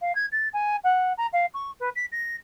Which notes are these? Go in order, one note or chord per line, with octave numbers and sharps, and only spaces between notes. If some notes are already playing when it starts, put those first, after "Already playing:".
F5
G#6
A6
G#5
F#5
A#5
F5
C#6
B4
B6
A#6